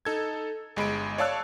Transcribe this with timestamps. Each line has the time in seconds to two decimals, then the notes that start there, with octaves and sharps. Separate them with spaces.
0.05 D#4 A4 G#6
0.76 G1 G#3 B5 D7
1.18 C#5 D5 F5 A5 E6 F#6